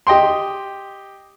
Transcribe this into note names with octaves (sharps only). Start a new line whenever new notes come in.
G4 D#5 G5 C6